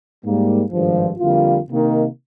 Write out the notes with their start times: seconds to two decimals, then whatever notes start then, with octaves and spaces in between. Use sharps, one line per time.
0.24 G#2 G3 A#3
0.72 G#1 G2 F3
1.19 F2 D3 G3 A#3 F4
1.68 C3 D#3 A#3 D#4